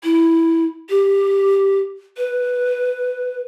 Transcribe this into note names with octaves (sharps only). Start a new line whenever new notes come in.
E4
G4
B4